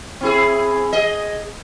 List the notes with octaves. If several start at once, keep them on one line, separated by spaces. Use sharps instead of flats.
C4 E4 G#4
G#4 D#5